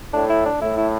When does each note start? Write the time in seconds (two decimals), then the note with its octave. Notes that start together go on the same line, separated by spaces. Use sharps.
0.13 A2 D4
0.29 E4
0.46 D4
0.61 A2 E4
0.77 E4